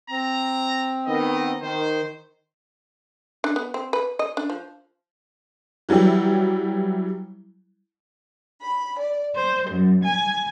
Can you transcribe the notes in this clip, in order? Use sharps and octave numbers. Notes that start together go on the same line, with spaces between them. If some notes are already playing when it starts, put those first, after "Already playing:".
C4 A#5
D#3 B3 D#5
D#3 C5
D4
B3
C4
B4
D#5
D4
F3
E3 F#3 G3 E4 G4
B5
D5
C5
F#2
G#5